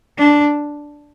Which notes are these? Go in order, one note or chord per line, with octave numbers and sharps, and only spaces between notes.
D4